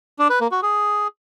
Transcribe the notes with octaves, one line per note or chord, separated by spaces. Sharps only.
D4
B4
A#3
F#4
G#4